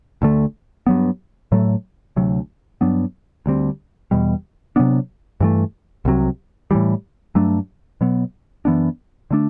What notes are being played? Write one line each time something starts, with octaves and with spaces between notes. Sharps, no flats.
D2 D3 A3
G2 F#3 B3
A2 F#3 A3
D2 C3 F#3
G2 F#3 B3 D4
D2 D3 G3 C4
E2 B2 G3
C3 F#3 B3 D4
G2 E3 A3
C2 C3 F#3
A2 E3 G3
G2 F#3 A3 D4
B2 F#3 B3
F#2 E3 B3 D4
D3 A3 D4